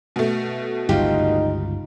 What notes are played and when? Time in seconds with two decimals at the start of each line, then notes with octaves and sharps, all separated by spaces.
0.16 B2 A3
0.89 G1 C#2 D#4 F4 G4